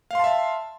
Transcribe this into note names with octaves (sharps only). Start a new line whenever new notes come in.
E5 F5 A5 C6